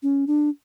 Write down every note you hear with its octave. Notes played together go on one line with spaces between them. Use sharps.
C#4
D4